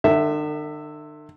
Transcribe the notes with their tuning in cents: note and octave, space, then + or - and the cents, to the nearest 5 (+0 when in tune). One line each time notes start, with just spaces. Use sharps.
D3 +45 E5 +0